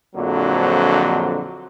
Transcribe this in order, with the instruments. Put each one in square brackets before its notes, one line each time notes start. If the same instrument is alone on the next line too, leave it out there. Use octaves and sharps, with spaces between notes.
[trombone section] A#1 F2 D3 F#3